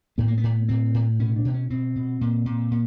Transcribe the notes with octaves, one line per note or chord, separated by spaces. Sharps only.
A2 B3
A#3
B3
A2
A2 C4
A2
B2 C#4
D4
B2
C#4
B2 C4
B2
A#2
A#2
A#2